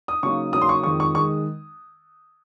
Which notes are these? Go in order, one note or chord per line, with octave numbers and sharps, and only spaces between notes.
D#6
C#3 F#3 A#3 D#4 C#6
C#3 F#3 A#3 D#4 D#6
C6
C#6
F2 D#3 G#3 C#6
C#6
D#3 G#3 C#6